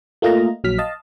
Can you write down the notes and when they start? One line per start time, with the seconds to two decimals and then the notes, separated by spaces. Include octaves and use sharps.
0.22 A3 A#3 F4 D#5 A#5
0.64 A#1 F#3 F6 B6
0.78 D#5 F5 A5